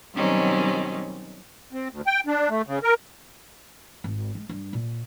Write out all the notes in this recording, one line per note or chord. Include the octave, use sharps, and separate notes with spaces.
B2 D#3 F#3 G3 C4 C#4
C4
D2
G5
D4
A3
C#3
A#4
G#1
G#3
G2
A#2